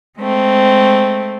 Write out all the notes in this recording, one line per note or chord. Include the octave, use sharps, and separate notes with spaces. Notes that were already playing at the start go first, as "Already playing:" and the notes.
G#3 A3 C4